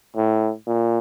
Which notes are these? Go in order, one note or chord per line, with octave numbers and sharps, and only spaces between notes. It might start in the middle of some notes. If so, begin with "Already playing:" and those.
A2
A#2